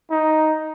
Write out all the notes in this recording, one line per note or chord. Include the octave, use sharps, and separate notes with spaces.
D#4